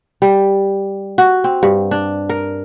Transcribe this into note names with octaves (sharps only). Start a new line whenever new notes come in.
G3
F#4
C4
G2
D4
A#4